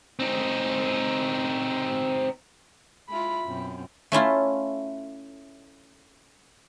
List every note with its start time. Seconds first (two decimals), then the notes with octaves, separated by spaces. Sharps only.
0.19 C4 D#4
3.09 G#3 E4 F4 B5
3.44 F#2 B2 C4
4.12 A3 C#4 E4 F4